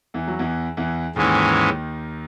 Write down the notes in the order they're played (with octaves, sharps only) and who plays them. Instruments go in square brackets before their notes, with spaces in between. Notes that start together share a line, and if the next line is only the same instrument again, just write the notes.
[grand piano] E2 E3
F#3
E2 E3
E2 E3
[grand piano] D#2 D#3 [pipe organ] G#2 E3 G#3 C#4